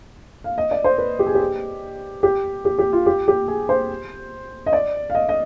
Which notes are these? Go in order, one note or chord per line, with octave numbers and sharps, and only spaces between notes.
F5
D#5
D5
C5
B4
G4
G#4
G4
G4
G4
G4
F4
G4
G4
G#4
C5
D#5
D5
F5
D#5
D#5